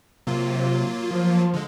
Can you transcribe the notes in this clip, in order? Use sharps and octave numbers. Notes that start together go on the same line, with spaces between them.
C3 F#3 A#3 F4
F3
D3 G#3